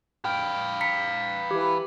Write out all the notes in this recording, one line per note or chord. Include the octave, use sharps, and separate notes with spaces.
B4 F5 G5
A#5 B6 C#7
E3 G4